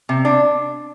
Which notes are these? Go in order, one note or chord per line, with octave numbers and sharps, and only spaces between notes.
C3
D4